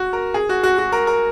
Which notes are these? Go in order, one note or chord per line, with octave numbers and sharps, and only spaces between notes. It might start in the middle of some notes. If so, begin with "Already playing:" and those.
Already playing: F#4
A#4
G#4
F#4
F#4
F#4
A#4
A#4